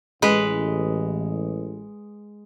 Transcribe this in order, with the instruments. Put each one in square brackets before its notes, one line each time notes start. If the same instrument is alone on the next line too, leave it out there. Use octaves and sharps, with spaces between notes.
[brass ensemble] A1 [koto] G#3 B4